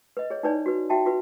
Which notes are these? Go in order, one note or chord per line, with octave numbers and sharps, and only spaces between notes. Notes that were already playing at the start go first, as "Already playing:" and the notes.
B4 D#5
G#4 C#5
D#4 E4 B4 C#5 D5 G#5
F#4 B4
F#4 E5 G5 A5
F4 F#4 B4